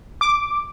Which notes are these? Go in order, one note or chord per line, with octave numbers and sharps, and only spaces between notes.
D6